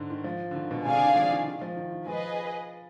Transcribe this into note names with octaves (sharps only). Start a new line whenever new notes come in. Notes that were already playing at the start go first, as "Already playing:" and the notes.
Already playing: G#2 D3
D#3
F3
D3
D#3
B2
C3 G#4 D5 F5 G#5
D3
D#3
F3
D#3
D#3
F3
D#3
D#3
F3 G#4 B4 D#5